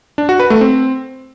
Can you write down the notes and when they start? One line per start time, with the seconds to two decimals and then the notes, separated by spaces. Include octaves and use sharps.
0.18 D4
0.29 F#4
0.40 B4
0.50 A3
0.61 C4